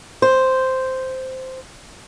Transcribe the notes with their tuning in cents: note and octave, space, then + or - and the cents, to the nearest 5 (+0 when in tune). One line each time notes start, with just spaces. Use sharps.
C5 -5